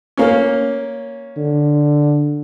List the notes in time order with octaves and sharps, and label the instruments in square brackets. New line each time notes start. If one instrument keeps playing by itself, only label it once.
[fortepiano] A#3 C#4
[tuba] D3